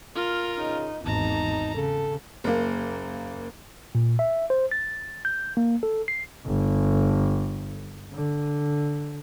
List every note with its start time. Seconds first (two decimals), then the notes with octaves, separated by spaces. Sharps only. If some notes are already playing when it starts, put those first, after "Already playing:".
0.15 F4 A#4
0.56 C#3 D#4
1.05 G#1 E2 D#4 A5 A#5
1.75 C#3 A4
2.44 F#1 A#3
3.95 A#2
4.19 E5
4.50 C5
4.71 A6
5.25 G6
5.57 A#3
5.83 A4
6.08 C7
6.46 G1
8.14 D3